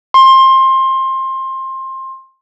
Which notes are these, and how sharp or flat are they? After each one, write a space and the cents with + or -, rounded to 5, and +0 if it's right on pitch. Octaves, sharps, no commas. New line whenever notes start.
C6 +20